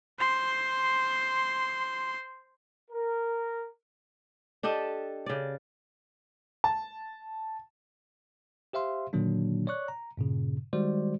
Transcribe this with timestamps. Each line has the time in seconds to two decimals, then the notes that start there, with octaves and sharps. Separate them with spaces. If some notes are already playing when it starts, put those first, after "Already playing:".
0.19 C5 C6
2.91 A#4
4.63 D4 G4 A4 D#5
5.26 C#3 D5
6.64 A5
8.73 G4 C5 E5 F5 C6
9.13 A#2 D3 D#3 F#3 A#3 D4
9.67 C#5 D5 C#6 F#6
9.88 A#5
10.17 G2 A#2 C#3
10.73 D#3 G3 G#3 F#4 C5 D5